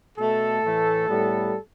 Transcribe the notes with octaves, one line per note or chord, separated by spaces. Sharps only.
B2 A3 A4
A2 E3 A3
A2 G3 B3